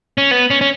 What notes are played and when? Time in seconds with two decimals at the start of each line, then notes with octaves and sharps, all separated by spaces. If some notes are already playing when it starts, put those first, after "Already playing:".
0.18 C#4
0.31 B3
0.50 C#4
0.61 C#4